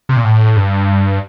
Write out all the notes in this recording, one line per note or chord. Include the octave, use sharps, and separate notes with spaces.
C3
A#2
A2
G2